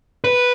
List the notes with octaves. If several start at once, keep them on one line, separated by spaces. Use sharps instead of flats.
B4